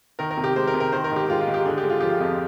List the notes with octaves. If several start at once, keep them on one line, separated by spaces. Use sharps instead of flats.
D#3 A#4
A#4
C3
G4
G#3 C5
A#4
C3
A#4
D#3 C5
A#4
G#2 G4
G#3 F4
F4
G#2
G4
D3 G#4
G4
G#3
F4
F3 G4
F4
F2